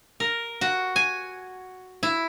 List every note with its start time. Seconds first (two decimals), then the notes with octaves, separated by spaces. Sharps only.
0.20 A#4
0.61 F#4
0.96 G#5
2.03 E4